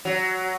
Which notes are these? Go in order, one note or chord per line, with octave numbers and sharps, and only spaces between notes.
F#3